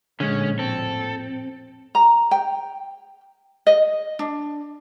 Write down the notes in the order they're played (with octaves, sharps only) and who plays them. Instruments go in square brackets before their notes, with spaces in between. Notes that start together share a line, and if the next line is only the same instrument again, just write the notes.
[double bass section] A#1 F2 A2 [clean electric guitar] D3 G#3 [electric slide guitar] C#4
[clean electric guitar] C4 [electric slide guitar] A4
[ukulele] A#5
G5
D#5
D4